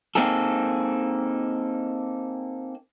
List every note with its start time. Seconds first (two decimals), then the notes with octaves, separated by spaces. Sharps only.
0.15 A#3 C4 D#4 G#4 A4